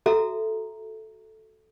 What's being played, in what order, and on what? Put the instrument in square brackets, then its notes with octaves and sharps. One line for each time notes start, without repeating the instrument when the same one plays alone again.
[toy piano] F#4 A4 E5 A#5